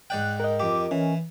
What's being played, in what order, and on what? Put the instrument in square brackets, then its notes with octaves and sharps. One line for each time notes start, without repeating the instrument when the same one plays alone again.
[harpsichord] G#2 D5 G5 [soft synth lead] F#6
[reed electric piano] A#4 D#5
[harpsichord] F2 G4 [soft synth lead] D6
[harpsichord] E3 [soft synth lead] C#4